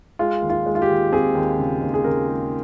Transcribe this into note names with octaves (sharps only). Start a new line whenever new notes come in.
G#3 F4
D#2
F4
G#3
F4
G4
D#2
C4 G#4
D#2
C#3
D#2
G#4
C#3 A#4
G#3